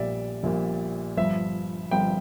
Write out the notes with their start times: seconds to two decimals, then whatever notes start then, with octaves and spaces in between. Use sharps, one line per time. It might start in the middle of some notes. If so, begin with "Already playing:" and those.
Already playing: A#1 A#2 G3 D5 E5
0.43 A#1 A#2 G3
1.17 G1 G2 F3 E5
1.91 G1 G2 F3 G5